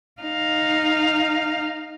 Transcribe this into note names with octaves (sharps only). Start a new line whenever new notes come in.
D#4 F5